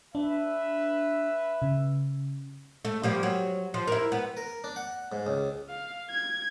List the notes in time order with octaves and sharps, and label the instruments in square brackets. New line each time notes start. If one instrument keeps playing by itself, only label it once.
[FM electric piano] D4 [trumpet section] B4 E5
[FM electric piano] C#3
[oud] A3
F3 G3 A#3
F#3
F3
E4 A#4
B3
[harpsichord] A#4
D4
F#5
G#2
C#2
[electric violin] F5
G#6